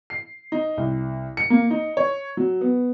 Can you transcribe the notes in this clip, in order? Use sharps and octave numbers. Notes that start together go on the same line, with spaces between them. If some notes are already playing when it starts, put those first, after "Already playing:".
C7
D#4
C2
C#7
A#3
D#4
C#5
F#3
B3